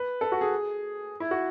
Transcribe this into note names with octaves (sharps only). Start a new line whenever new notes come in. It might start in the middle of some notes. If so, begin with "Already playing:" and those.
Already playing: B4
A4
F#4
G#4
E4
F#4